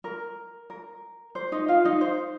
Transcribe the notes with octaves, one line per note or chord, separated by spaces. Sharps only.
A#4
A#4
C5
D#4 D#5
F4 F5
D#4 D#5
C5